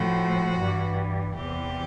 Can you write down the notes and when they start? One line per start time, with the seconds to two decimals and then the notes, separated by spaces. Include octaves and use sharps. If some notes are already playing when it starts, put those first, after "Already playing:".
Already playing: A2 F3 F#4
0.61 G2 E3
1.35 E2 C3 E3 G4